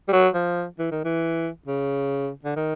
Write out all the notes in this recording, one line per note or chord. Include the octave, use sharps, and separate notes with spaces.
G3
F#3
F3
E3
D#3
E3
C#3
D3
D#3